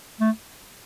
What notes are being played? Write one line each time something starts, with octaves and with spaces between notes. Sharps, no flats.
A3